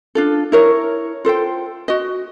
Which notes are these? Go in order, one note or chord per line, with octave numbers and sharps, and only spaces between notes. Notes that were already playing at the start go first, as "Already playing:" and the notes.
D4 F4 A4
E4 A#4 C#5
F4 A4 C5 G5
F#4 D#5